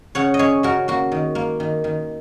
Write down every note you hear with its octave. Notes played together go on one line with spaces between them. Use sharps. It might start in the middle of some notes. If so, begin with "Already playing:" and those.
C#3 C#5 F#5
D#5
C#4 G#4 C#5
C#3 F#4 A#4
A#3 F#4
D#3
A#3
D#3
D#3